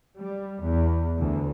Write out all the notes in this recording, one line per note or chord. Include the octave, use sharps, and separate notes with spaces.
G3
E2
D2 E3